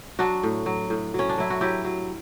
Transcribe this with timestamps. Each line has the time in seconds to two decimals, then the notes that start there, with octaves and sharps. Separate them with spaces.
0.19 F#3 D4 F#4
0.43 A2
0.66 F#3
0.90 A2
1.14 F#3 C#4
1.29 D4
1.38 F#3 E4
1.50 F#4
1.61 F#3 E4 G4
1.85 F#3